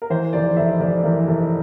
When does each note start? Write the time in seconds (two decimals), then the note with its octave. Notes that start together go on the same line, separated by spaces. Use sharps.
0.02 A#4
0.10 E3 C5
0.33 F1 D5
0.56 F1 E5
0.80 F1 D5
1.04 E3 A#4
1.28 F1